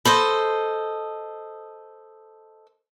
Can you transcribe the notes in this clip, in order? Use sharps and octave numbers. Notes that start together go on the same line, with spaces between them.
A4 C5 D#5 B5 C6